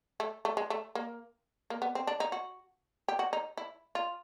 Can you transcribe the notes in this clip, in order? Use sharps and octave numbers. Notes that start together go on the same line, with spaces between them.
A3
A3
G#3
A3
A#3
A#3
B3
C4
D4
D#4
F#4
G4
F#4
D#4
E4
F4